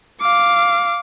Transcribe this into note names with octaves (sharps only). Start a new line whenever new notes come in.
F5 D6